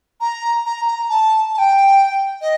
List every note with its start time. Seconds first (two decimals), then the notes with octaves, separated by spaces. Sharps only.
0.21 A#5
0.65 A#5
0.87 A#5
1.09 A5
1.54 A5
1.58 G5
2.41 D#5